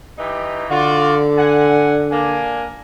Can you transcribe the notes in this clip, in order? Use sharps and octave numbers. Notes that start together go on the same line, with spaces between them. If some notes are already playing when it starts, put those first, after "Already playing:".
E3 D#4 G4
D3 F4 F#4 D5
F#5 G#5
A#3 D4 G#5